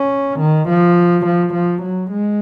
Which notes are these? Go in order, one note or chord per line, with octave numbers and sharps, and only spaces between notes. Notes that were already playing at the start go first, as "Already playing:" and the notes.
Already playing: C#4
D#3
F3
F3
F3
F#3
G#3